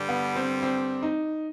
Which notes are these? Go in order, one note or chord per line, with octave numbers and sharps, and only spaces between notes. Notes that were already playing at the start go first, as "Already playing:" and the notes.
Already playing: G2 D3 G3
B3
C4
C4
D#4